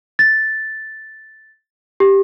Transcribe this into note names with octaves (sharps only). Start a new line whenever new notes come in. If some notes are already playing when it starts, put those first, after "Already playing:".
A6
G4